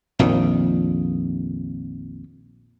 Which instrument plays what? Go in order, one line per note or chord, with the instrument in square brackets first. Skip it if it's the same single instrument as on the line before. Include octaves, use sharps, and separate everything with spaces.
[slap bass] A#1 F2 D#3